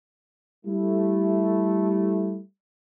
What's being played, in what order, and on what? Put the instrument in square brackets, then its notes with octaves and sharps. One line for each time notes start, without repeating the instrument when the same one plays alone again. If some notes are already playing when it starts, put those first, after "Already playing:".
[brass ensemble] G3 A3 E4